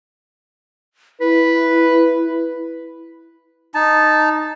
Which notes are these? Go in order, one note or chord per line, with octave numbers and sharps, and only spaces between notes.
E4 B4
D#4 A5